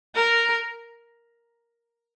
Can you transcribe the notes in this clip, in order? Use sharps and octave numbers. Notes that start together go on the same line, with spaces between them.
A#4